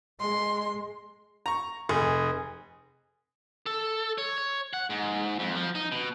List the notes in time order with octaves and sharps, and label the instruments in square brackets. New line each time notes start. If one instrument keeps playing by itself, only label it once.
[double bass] G#3 [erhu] C6
[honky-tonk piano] A#5 C#6
[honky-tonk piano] F1 [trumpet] G#4
[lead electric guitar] A4
C#5
C#5
F#5
G#2
F2
F3
D#4
B2